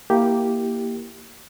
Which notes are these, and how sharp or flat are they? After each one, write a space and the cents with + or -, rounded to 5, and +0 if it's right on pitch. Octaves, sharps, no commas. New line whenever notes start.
A#3 +0 E4 +0 G4 +0